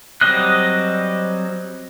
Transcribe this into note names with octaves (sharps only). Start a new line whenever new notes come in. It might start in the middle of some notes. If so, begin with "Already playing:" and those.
F#3 G3 C4 D#5 F#6